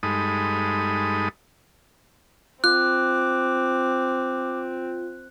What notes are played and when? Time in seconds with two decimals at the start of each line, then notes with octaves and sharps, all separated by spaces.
0.03 G2 G#3 D#4 A4 B5 D#6
2.64 C4 F4 D6 F#6